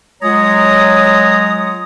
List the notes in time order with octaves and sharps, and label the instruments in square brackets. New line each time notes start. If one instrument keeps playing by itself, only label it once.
[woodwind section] F#3 G#3 F4 C#5 A#5 D#6